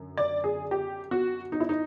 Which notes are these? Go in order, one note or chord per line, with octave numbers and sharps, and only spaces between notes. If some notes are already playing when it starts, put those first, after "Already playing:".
Already playing: F#2 D3
D5
G#4
G4
F#4
D#4
E4
D#4